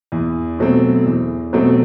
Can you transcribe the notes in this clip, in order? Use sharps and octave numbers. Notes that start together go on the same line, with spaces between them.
E2
B2 F#3 A3 C4
E2
B2 F#3 A3 C4